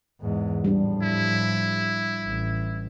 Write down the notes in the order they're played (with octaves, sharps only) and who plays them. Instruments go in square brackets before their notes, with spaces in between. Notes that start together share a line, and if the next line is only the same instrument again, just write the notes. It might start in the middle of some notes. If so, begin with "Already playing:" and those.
[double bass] E2 G#2
[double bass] A2 F3 [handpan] G3 D4
[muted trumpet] E4
[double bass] A1